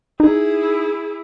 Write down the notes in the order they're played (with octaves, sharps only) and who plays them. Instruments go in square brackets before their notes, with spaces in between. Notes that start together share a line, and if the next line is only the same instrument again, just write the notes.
[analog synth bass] D#4 [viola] E4 G#4